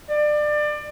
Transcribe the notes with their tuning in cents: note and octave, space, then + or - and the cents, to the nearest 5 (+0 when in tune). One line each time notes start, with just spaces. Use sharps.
D5 +25